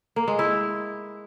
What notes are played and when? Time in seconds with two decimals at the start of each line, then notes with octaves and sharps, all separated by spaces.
0.16 A#3
0.28 G#3
0.39 E4